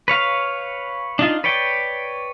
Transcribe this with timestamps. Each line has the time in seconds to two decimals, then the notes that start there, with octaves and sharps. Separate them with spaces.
0.08 B4 C#5 F5
1.19 D4 D#4 F4
1.44 B4 C#5 D5 G5